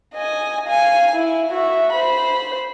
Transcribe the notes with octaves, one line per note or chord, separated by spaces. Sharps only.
D#5 G#5
F5 G#5
E4
F#4 E5
C5 B5